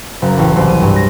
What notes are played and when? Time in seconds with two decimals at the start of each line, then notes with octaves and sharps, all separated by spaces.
0.22 F#1
0.38 A1
0.56 C2
0.69 D#7
0.82 G2
0.96 A#6